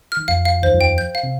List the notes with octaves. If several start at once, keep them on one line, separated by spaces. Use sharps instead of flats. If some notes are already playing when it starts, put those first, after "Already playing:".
F6
D#3
F2 F3 F5
F5
D#2 D#3 C5
F2 F3
G5
G6
F5
C3